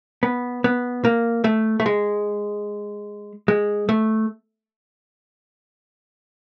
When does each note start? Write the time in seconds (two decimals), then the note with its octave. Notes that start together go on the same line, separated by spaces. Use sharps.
0.23 B3
0.64 B3
1.05 A#3
1.44 A3
1.80 A3
1.86 G#3
3.48 G#3
3.89 A3